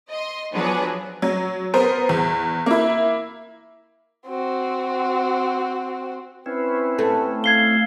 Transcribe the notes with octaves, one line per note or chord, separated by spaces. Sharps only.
D#5 C6
F3 F#3 B3 D4 G#4 B4
F#3
B3 A#4 C5
E2
A#3 E4
C4 F#4
C4 C#4 E4 B4
A3
F5 G#6 C7 G7